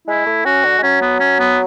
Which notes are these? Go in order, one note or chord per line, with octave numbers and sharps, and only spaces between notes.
G#3 E4
A3
C#4 F#4
D3
G#3
F#3 C#4
B3
C#4
B3